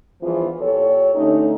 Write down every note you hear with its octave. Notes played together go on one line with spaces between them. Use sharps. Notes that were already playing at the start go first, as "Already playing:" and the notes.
E2 G2 E3 F3 B3 F4
A#2 G4 A4 C#5
D3 A3 C#4 D#4